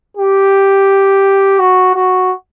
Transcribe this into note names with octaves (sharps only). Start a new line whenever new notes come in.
G4
F#4
F#4